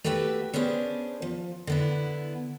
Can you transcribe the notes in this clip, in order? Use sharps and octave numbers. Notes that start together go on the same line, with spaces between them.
A3 F#4 G4 B4 E5
B3 C#4 D4 G#4 C5
F3
D3 B3 E4